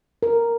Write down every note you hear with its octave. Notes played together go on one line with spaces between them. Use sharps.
A#4